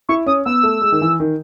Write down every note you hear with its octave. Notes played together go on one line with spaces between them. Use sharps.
E4 C#6
C#4 D#6
B3 E6
A3
G#3
D#3
E3
D#3